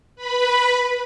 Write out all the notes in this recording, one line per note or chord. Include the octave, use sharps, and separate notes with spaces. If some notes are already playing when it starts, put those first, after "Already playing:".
B4 B5